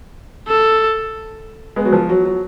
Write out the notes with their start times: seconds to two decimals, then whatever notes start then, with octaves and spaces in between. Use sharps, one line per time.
0.48 A4
1.76 G#3 B3
1.85 F#3
1.93 F3
2.09 F#3
2.25 F#3